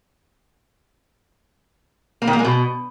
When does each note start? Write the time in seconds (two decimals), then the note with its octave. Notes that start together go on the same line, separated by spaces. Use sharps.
2.22 A#3
2.27 D#3
2.33 A#3
2.39 G#3
2.44 B2